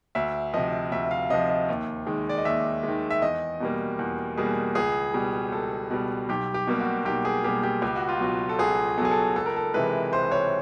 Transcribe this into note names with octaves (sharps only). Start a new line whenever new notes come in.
D2 E5
C3 F3 D#5
D2 E5
F5
C3 F3 D#5
D#5
D#2
D#3 G#3
D5
D#5
D#2 E5
D#3 G#3
E5
E2 D#5
B2 G3 A#3
E2
B2 G3 A#3 G#4
C#2 G#4
B2 G3
C#2 A4
B2 G3
B1 G4
G4
B2 G3 A#3
F#4
B1 G4
G#4
B2 G3 A#3 G4
G4
C#2 G4
F#4
F4
B2 F#3 F#4
A4
C#2 G#4
B2 F#3 G#4 A4
A4
C#2 A4
A#4
A4
C3 E3 G#3 B4
C#2 C5
C#5